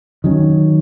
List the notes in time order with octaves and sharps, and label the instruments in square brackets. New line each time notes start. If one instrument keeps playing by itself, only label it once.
[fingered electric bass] D#3 F#3 C#4